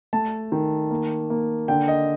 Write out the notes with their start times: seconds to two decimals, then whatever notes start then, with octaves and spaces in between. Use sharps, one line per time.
0.13 A3 A5
0.52 D#3
0.91 A#3
1.30 A#3
1.68 D3 G5
1.88 D#5